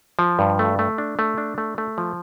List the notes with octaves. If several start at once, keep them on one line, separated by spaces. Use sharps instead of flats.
F3
G2
A3
A3
D4
A3
D4
A3
A3
F3